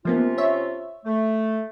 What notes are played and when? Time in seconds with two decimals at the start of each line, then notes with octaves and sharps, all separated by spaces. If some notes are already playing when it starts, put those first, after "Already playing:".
0.05 C3 F3 A#3 B3 C#4 F4
0.38 C#5 E5
1.05 A3